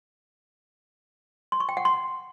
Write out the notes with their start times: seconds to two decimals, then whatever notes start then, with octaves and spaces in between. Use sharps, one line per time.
1.52 C6
1.60 C#6
1.69 G5
1.77 F#5
1.85 C6